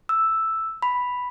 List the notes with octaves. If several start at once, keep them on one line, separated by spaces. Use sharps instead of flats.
E6
B5